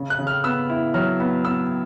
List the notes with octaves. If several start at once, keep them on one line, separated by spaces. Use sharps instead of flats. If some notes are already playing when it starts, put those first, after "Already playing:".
Already playing: C#3
F#6
C#3
F6
B3 E6
E4
F#3 F6
B3
B3 E6